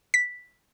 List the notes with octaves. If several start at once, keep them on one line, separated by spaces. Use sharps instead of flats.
B6